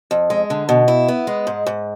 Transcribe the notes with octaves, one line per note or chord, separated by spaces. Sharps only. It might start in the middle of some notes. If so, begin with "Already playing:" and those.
F2
G#3
D3
B2
E4
B3
G#3
G#2
G#2